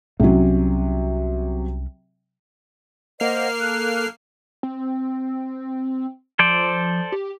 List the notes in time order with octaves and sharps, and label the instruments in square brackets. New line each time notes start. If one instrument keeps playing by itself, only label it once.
[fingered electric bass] C2 C#4 [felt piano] C3 F#3
[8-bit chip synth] A#3 F6 C7 [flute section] C5 D#5 F#5
[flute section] A4 F#6
[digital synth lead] C4
[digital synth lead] F3 [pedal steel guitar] A4 C5 D5
[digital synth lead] G4